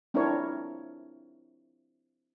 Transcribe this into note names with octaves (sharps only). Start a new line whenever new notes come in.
C4 D4 E4 F4 A#4 C#5